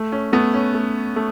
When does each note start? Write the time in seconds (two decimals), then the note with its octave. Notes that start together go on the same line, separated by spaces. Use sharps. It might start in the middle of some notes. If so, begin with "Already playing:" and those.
Already playing: A3
0.12 C#4
0.33 A3 B3
0.54 C#4
0.75 A3
1.16 A3